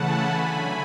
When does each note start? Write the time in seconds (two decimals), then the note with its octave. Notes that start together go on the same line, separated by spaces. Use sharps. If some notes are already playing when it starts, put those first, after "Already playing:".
Already playing: C#3 E3 A3 F#5 G#5 A5 B5
0.26 D3 F#3 A3